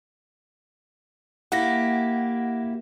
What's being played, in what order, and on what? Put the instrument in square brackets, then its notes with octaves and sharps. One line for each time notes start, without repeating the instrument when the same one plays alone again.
[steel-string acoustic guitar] A#3 E4 G4 [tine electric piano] F#5 A#6